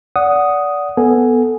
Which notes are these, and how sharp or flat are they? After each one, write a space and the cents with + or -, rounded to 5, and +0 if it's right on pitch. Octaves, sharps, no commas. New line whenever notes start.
D5 -25 F#5 +0 D#6 +0
B3 +0 A4 +0 G#5 +0